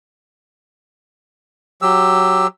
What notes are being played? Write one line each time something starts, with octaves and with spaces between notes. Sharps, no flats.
F#3 G4 E6